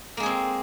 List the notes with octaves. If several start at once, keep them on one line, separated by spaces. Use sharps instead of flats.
G#3 A#3 C4 G#4